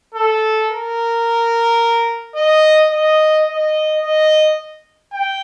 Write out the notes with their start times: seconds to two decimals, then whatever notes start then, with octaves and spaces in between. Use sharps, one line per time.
0.14 A4
0.70 A#4
2.36 D#5
2.91 D#5
3.47 D#5
4.03 D#5
5.13 G5